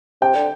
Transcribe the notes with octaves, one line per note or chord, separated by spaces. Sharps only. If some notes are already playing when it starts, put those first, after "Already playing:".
C3 G5
D3